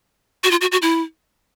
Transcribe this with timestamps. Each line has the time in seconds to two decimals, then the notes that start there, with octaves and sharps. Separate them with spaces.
0.44 F#4
0.51 F4
0.61 F#4
0.72 F#4
0.82 E4